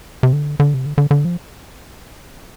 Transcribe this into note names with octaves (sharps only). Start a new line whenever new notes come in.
C3
D3
D3
C3
D3
D3
D3
F3